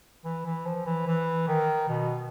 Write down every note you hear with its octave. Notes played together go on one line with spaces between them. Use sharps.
E3
E3
F3
E3
E3
D#3
B2